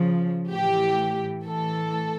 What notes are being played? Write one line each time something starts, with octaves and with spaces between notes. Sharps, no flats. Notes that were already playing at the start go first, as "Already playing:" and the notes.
Already playing: C#3 F3
A2 E3 G4
A2 E3 A4